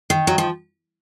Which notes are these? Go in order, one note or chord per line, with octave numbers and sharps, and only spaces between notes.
D#3
F#3
F3